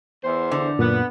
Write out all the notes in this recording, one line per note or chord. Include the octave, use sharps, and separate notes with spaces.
E2 C5
D3
F#2 A#2 B3